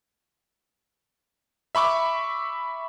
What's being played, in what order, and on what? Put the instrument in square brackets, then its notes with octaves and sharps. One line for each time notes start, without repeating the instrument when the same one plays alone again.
[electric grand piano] E5 B5 C#6 D6